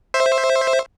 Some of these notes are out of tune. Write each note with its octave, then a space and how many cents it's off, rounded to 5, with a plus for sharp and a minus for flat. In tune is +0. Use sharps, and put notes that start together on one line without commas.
C5 +10 E5 +0